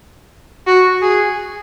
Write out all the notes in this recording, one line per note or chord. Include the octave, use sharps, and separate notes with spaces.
F#4
G#4